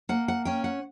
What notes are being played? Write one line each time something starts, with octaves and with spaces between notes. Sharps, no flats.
A#3 F#5
F#5
C#4 G5
F#5